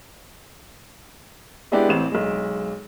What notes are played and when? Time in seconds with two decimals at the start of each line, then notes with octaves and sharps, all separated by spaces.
1.72 G#3 B3 D4 E4 G4 D5
1.89 A1 C4 E7
2.11 B1 G#3